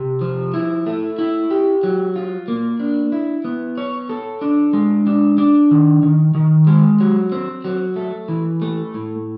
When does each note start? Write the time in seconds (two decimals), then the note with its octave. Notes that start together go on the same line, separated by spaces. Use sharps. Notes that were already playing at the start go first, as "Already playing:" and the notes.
Already playing: C3
0.21 F3
0.54 E4
0.86 A3
1.19 E4
1.50 G4
1.83 F#3
2.16 F4
2.48 A#3
2.80 D4
3.12 E4
3.45 B3
3.78 C#5
4.09 A4
4.41 D4
4.73 G#3
5.07 D4
5.38 D4
5.71 D#3
6.03 D#3
6.35 D#3
6.67 G#3
7.01 F#3
7.32 C4
7.64 F#3
7.96 A3
8.28 E3
8.62 A3
8.94 A2